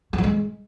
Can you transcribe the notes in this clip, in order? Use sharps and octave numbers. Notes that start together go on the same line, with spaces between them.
F#3
F3
G#3